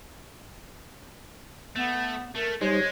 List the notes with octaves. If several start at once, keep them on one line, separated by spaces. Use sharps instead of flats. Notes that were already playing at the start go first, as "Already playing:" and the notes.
A3 B3
A3 A#4
G3 G#3 D#4 C5 C#5